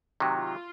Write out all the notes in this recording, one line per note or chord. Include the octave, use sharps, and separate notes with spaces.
C3 D#3 F#3
F4